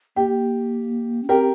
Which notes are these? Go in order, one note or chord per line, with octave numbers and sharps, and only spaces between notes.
A#3 G4
C#4
C4 G4 A#4